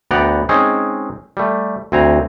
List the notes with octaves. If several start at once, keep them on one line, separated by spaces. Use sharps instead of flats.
D2 B3 D5 F#5 G5 A#5
G#3 C4 C#4 D#4 G#4
G3 A3
D2 C4 G#5 A#5